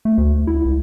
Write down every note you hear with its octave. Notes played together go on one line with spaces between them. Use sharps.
A3
D2
E4
C#2